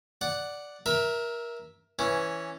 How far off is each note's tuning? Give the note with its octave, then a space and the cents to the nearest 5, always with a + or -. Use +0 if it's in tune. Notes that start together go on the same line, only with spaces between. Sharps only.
D5 +0 F#5 +0
A#4 +20 E5 -5 A#5 +0
E3 +0 C#4 +0